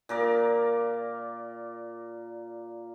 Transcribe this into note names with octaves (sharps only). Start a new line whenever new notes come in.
A#2 A#4 D5